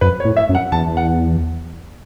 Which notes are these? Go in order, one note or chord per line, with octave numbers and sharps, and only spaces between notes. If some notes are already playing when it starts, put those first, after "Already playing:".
F#2 B4
C#5
A2
E5
F#2
F#5
E2 A5
F#5